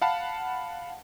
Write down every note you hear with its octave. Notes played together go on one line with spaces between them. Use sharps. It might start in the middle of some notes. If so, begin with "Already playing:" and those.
F5 F#5 A5 B5